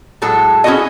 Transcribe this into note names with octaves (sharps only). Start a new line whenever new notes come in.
A2 F#3 G#3 A4
C#4 E4 F#4 G#4 A4 D#5